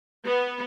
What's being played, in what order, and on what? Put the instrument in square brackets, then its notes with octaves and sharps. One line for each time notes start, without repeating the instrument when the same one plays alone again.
[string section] B3